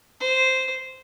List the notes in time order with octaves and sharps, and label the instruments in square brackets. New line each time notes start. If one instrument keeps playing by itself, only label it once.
[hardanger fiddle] C5